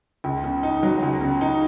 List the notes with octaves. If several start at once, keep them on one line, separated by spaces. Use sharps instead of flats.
C#2
C#3
D#4
F#3
C#2
C#3
D#4